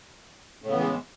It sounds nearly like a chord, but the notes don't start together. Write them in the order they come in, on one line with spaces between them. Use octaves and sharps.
A2 C#3 B3 E3 G#3